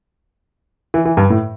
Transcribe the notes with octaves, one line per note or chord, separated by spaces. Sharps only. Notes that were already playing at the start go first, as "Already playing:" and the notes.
E3
E3
G2
A2